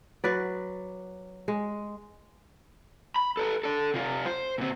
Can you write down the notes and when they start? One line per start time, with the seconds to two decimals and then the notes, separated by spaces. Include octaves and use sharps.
0.24 F#3 B4 D5
1.48 G#3
3.16 B5
3.37 A4 B4
3.64 A4 D5
3.94 C3 F4
4.26 C5
4.58 A#2 C4